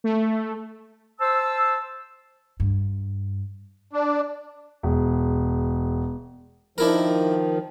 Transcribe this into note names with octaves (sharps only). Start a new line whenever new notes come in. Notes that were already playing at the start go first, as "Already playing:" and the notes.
A3
C5 A5 E6
G2
D4
E1
D#3 F3 D4 E4 A#4